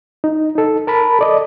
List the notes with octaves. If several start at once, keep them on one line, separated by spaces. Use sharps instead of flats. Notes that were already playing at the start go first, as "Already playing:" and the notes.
D#4
D#4 A4
A#4 A5 B5
A4 D5 D#5